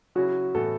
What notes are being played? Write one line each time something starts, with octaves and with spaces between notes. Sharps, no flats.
C#3 F#3 C#4 E4 F#4
A2 E3 B3 F#4 A4